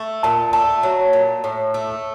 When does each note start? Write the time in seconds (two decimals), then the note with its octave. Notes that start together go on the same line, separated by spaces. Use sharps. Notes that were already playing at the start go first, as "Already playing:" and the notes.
Already playing: A3
0.23 A#2 A5
0.53 A3 A5
0.83 F#3
1.13 A#2
1.44 A2
1.74 A3